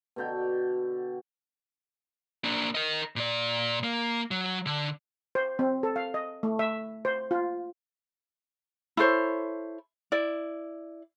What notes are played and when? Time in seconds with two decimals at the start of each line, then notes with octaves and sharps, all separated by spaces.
0.16 B2 D3 G5
2.44 A#3 D4
2.75 A#4 D#5
3.16 A#2 D5
3.84 A#3
4.31 F#3
4.66 D3
5.35 C5
5.59 C4
5.83 A4
5.96 F5
6.14 D#5
6.43 A3
6.59 E5
7.05 C5
7.31 F4
8.97 E4 A4 C5 C#5
10.12 E4 D5